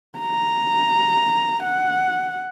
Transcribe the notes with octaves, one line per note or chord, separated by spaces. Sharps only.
A#5
F#5